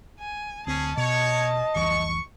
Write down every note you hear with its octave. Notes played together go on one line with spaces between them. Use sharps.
G#5
D2 C4 C#4 G#4 A5
B2 C#5 D#5
F1 C2 E3 C#6